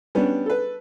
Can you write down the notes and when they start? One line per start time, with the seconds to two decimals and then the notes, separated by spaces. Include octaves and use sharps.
0.15 G3 B3 C#4 D4
0.46 A4 B4